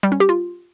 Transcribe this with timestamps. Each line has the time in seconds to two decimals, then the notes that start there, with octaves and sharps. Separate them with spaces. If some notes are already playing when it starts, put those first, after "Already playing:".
0.03 G3
0.12 C#4
0.20 G4
0.29 F4